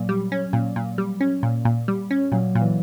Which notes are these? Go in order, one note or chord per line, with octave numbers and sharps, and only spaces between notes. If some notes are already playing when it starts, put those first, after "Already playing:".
Already playing: A#2 F#3
G3
C#4
A#2
A#2
G3
C#4
A#2
A#2
G3
C#4
A#2 F#3
A#2
E3